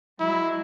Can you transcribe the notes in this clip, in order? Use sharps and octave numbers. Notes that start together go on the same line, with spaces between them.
F#3 G#3 E4